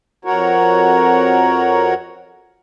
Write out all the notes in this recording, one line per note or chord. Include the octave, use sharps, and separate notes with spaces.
F2 F#4 A#4 C#5